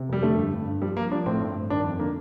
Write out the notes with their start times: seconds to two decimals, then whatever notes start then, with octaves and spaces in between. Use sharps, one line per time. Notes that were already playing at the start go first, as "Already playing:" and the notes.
Already playing: C3
0.09 F2 G3
0.23 D3 A3
0.38 G2
0.53 G2
0.67 G2
0.82 F3 G3
0.96 F3 A#3
1.11 F3 D4
1.26 A2 C4
1.41 G2
1.55 G2
1.70 D#3 D4
1.85 F2
1.99 D3 A#3